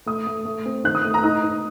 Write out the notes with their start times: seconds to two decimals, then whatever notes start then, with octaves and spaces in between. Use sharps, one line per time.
0.06 A3 D#6
0.27 A3
0.45 A3
0.65 C4
0.84 D#3 F#6
0.95 D#6
1.04 A3
1.14 A#5
1.23 D#4 D#6
1.43 D#4